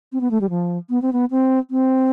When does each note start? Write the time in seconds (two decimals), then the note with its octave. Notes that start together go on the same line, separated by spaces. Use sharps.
0.12 C4
0.21 B3
0.31 A3
0.41 G3
0.50 F3
0.90 B3
1.02 C4
1.13 B3
1.31 C4
1.71 C4